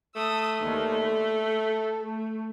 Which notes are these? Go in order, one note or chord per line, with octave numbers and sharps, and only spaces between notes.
A3 A5 D#6 E6
D#2 D3 D#3
A4
A3